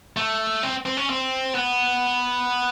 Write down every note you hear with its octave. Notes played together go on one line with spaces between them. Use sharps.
A3
C4
C4
C#4
C4
B3